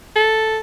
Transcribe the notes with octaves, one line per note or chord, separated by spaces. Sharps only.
A4